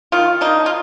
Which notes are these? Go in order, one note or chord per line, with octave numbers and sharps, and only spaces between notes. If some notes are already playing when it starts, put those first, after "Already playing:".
D#3 F4
A#3 D4 D#4
F4